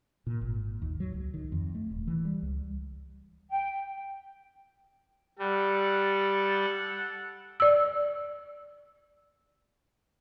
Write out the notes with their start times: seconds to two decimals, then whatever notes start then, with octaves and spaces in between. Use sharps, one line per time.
0.27 A#2
0.41 G#1
0.82 D#2
1.00 F#3
1.14 C#2
1.34 D#3
1.52 F2
1.75 A3
1.91 D#1
2.07 E3
2.25 G3
2.42 C#2
3.51 G5
5.39 G3 A4 F#5
7.60 D5 E6